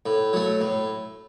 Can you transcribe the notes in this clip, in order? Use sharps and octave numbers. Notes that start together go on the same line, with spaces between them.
A2
F#3 A3
A2